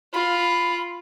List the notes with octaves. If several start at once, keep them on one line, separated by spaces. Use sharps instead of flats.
F4 B5